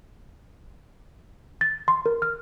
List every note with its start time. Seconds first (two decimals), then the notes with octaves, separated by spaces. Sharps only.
1.61 A6
1.88 C6
2.06 A#4
2.22 F6